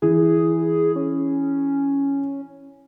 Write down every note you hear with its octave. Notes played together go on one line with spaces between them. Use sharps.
E3 G#4
C#4